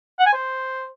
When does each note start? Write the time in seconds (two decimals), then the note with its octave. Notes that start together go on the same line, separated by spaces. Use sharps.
0.20 F#5
0.26 G#5
0.33 C5